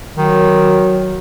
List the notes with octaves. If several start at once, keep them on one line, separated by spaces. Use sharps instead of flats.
D#3 F#3